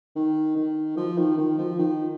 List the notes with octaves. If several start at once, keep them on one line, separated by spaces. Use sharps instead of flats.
D#3
D#3
F3
D#3
D#3
F3
D#3